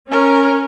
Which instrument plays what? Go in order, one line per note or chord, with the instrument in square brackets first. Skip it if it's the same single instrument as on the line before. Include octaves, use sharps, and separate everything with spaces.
[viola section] C#4 [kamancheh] A#4